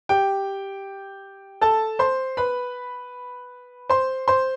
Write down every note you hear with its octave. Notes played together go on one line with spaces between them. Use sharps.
G4 G5
A4 A5
C5 C6
B4 B5
C5 C6
C5 C6